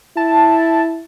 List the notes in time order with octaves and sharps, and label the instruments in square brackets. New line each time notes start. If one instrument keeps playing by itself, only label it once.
[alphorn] E4 [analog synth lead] A5